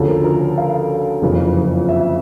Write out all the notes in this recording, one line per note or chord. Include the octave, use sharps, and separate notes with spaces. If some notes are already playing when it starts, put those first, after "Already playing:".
Already playing: D2 C#3 F3 A4
A#4
A#4
F5
F#1 F2 C#3 E3
E5